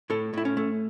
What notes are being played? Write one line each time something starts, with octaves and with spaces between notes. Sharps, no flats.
A2 A4
A2 E4
C#4
A3